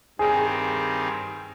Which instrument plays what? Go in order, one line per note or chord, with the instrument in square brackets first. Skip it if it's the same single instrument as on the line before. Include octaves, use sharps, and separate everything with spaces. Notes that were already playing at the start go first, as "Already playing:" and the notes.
[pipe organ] G2 D#3 G3 C4 [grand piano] G#4